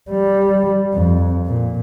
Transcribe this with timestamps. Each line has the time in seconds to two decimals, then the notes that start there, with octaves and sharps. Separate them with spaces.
0.11 G3
0.94 F2
1.47 A#2